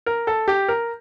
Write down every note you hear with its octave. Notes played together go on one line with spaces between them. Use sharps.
A#4
A4
G4
A#4